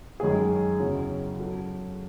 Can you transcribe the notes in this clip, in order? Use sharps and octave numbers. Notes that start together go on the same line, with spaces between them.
F#2 D#3 G#3 C#4 G#4
E2 C#3 F#3 C#4 E4
F#3 C#4 F#4 A4